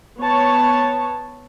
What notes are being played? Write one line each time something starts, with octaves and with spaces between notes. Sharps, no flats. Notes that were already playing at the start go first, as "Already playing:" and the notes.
B3 C#5 A5